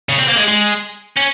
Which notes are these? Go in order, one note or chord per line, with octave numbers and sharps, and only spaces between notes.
C#3
C4
A#3
G#3
G#3
C#4